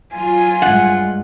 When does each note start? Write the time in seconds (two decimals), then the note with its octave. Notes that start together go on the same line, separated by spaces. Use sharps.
0.13 F#3 F4 G#5
0.62 G2 G#3 F#5